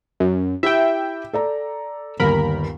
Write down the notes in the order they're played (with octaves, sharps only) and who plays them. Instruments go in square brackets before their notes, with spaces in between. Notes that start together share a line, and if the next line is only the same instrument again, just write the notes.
[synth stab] F#2
[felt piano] E4 G4 [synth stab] E5 G5
[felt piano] A4 D5 A#5
[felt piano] G1 D#2 [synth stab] A#4 B5